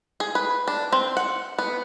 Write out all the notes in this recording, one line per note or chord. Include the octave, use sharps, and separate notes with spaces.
G#4
B4
D4
C4
F#5
B3